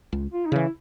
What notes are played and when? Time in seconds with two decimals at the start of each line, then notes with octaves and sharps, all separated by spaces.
0.12 C#2
0.32 F4
0.46 D#4
0.52 C#3 E3 E4